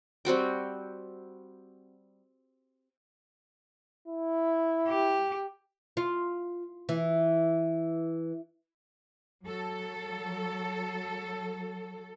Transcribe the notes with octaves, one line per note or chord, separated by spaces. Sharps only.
G3 C4 F#4 G5
E4
G4
F4
E3
F#3 A4